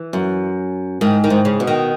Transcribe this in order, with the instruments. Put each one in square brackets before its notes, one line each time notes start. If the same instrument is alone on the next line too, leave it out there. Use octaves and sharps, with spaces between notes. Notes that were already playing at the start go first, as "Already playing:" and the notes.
Already playing: [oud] E3
[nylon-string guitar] F#2
[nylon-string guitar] G#2 [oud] D#3
[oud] D#3
[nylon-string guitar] G#2
[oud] C#3
[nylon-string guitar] B2
[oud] D#3